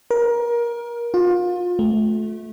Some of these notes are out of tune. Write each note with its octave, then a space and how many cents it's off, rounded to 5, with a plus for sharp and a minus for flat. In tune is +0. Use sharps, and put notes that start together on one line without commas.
A#4 +25
F4 +30
A3 -25